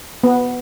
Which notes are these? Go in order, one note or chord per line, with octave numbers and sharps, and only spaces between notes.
B3